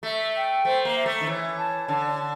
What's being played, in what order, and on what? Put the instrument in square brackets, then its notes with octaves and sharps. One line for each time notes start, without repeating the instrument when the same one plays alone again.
[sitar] A3 [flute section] E5
[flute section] G5
[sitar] A3 [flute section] C5
[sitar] A#3
[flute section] E5
[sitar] A3
D#3
[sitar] E3 [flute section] C#5
[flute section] A5
[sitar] D3 [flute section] A5
[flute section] A5